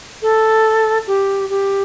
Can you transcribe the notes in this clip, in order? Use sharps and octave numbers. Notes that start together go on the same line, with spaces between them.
A4
G4
G4